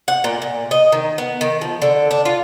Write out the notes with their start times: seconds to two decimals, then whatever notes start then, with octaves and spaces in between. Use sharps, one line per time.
0.08 F#5
0.24 A#2
0.42 A#2
0.71 D#5
0.92 D#3
1.18 B3
1.41 D#3
1.61 F3
1.82 D3
2.11 D4
2.25 F4